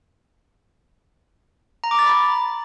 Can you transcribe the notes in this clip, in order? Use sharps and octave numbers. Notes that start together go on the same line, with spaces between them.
A#5
D6
A6
B5